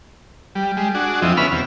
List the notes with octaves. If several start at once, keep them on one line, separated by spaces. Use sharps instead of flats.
G3
G3 G#3
D4 F#4 G#4
F2 F3 C4 E4 D#5
D3 B3 C#4 E5 B5 F6
E2 C3